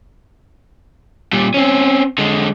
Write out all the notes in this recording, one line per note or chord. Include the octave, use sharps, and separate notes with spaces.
A#2 G3
C4 C#4
D3 G#3